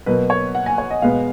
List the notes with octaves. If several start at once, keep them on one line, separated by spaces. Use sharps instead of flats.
B2 F#3 A#3 B4
C#5
F#5
G#5
C#5
D#5
B2 G#3 B3 F5